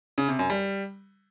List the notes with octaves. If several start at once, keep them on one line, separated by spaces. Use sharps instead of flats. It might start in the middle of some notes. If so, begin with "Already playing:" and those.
C#3
C3
F#2
G3